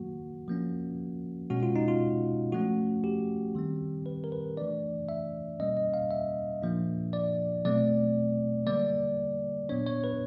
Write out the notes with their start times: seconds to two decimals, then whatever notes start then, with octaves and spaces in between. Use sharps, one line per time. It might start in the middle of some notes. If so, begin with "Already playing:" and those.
Already playing: D#3 F#3 A#3 F#4
0.48 F3 A#3 C#4
1.50 B2 G#3 C#4 F#4
1.63 F4
1.76 D#4
1.88 F4
2.52 F3 A3 C#4 F#4
3.04 G4
3.55 D#3 G3 C4
4.06 B4
4.24 A#4
4.32 B4
4.57 E3 A3 D4 D5
5.09 E5
5.60 B2 G3 A#3 C#4 D#5
5.77 D#5
5.94 F5
6.11 E5
6.62 A#2 F3 A#3 D4
7.13 D5
7.65 B2 F#3 A3 C4 D5
8.67 D3 G3 A#3 D5
9.69 A#2 F#3 B3 D4 C#5
9.87 C#5
10.04 B4